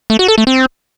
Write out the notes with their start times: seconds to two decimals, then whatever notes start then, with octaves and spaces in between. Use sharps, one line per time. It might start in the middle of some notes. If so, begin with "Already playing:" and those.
0.10 A3
0.19 F#4
0.28 A4
0.38 A3
0.47 C4